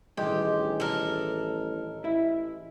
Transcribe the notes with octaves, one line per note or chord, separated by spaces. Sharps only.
A1 G2 D#3 G#3 G4
A4 A#4
A1 E4 E5